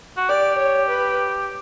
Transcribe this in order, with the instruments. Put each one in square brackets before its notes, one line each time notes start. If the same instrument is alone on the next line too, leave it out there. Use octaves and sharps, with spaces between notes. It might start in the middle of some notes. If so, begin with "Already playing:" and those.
[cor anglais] F#4
[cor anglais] G4 [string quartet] D5
[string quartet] C#5
B4